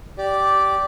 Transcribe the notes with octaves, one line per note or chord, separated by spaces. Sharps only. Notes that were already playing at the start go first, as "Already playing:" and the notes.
G4 D5